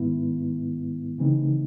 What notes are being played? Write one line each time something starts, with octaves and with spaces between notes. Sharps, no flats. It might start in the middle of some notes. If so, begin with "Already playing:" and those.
Already playing: G#2 D#3 G#3 B3 E4
C#3 E3 A3 C4 D#4